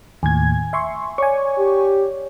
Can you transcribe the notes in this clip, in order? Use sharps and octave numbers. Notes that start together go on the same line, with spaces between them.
D#2 A2 G#5 G#6
E5 C6 C#6
C#5 D5 G#5 C#6 D6
G4